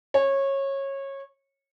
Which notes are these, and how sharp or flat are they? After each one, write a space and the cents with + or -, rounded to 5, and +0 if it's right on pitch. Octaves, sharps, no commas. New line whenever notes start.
C#5 -20